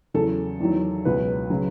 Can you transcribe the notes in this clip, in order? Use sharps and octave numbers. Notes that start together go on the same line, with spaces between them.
E2 C#3 F#3 A4
E2 D#3 F#3
C#2 B2 F#3 B4
C#3 F#3